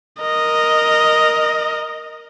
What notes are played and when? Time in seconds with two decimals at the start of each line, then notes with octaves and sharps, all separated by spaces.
0.21 A#4 D#5